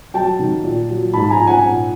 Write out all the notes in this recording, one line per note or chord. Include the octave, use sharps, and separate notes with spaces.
F#3 G5 A5
D#3
A#2
F#3
G#2 A5 B5
G#5 A#5
F3
F#5 G#5
A#2